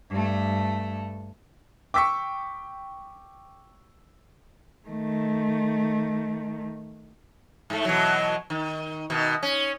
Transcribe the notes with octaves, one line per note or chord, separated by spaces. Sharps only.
G2 A3
G5 C#6 D6 E6 B6
D#3 A3
G#2 A3
B2 E3 F#3
D#3
B2 D#3
C#4